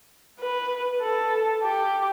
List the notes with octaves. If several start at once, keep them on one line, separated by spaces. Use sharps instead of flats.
B4
A4
G4